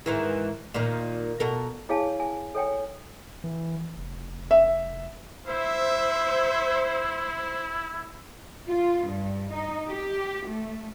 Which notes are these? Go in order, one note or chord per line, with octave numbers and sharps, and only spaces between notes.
G#2 D#3 E3
A#2 D#3
B2 A4 A#4
E4 G#4 C#5 F5 G#5 A5
G#5
A4 C#5 G5 G#5
E3
F1
E5
E4 C5 E5
F4
G2
D#4
G4
A3